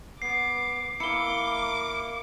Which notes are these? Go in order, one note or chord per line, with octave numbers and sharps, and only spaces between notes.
B3 D6 C7
A#3 E4 D6 C#7 G7